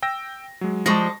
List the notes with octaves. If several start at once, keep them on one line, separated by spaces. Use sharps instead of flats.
G5 E6 A#6
F#3 G#3
F3 G3 G#3 A5 C#6 A#6